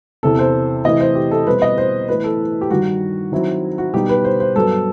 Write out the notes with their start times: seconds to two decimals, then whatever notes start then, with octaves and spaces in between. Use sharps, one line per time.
0.23 E2 C3 E3 A4
0.39 C5
0.85 C3 E3 A3 E4 D#5
1.00 C5
1.15 G4
1.31 A4
1.46 B2 G3 C4 B4
1.62 D#5
1.78 C5
2.08 A2 E3 B3 B4
2.24 A4
2.61 G4
2.70 G2 D#3 G3 F#4
3.32 D#3 F#3 C4 E4
3.78 F#4
3.94 B2 G3 D#4 G4
4.09 B4
4.25 C5
4.40 C5
4.56 G2 F#3 B3 A4